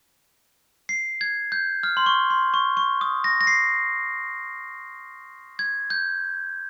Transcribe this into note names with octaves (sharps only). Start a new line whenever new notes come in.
C7
G#6
G6
F6
C6
C#6
C6
C#6
C#6
D#6
A#6
A#6
C7
G#6
G6